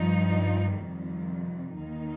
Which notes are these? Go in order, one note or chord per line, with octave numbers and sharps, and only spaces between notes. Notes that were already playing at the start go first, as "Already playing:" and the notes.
Already playing: G2 F3 D#4
F2 C3 D#3 G3
D#2 D#3 A#3 D#4